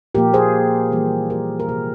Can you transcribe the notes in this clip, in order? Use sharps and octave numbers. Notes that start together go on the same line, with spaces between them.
A#2 F3 A#3 G4 A#4
G#4 C5
E3 G3 A#3
G4 A#4
A#4
C3 G3 A#3 G#4 C5